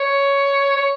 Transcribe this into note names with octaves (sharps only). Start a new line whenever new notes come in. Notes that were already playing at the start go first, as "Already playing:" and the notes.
Already playing: C#5
C#5